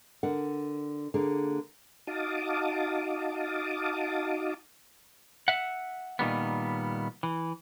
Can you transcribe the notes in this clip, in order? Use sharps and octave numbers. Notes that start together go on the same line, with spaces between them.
D3 A#4 F#5
D3 A#3 G#4
D#4 F#4 F5 A5 D6 D#6
E5 F#5
A#2 D#3 G3 B3
E3